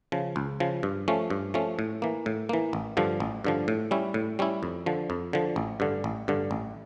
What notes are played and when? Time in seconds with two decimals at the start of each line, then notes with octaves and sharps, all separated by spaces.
0.12 C#3 F3
0.36 C#2
0.60 C#3 F3
0.83 G2
1.08 F3 A3 C#4
1.30 G2
1.54 F3 A3 C#4
1.79 A2
2.02 E3 A#3
2.26 A2
2.49 E3 A#3
2.73 A1
2.97 G2 D3 F3
3.20 A1
3.44 G2 D3 F3
3.68 A2
3.91 G3 C#4 E4
4.14 A2
4.39 G3 C#4 E4
4.63 F2
4.86 D3 F3
5.10 F2
5.33 D3 F3
5.56 A1
5.80 G2 D3
6.04 A1
6.28 G2 D3
6.51 A1